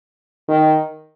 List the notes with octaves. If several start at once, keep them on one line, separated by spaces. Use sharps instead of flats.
D#3